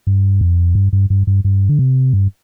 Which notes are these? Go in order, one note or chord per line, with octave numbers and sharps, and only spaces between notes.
G2
F2
G2
G2
G2
G2
G2
D3
C3
G2